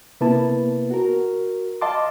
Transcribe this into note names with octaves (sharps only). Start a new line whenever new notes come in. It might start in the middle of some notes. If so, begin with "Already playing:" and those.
C3 A#3 B3 E4 B4 A5
F#4 A#4
D#5 F5 A5 C6 D6